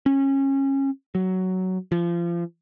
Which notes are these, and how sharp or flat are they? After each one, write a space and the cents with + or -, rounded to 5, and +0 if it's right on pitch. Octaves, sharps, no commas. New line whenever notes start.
C#4 -25
F#3 +10
F3 -30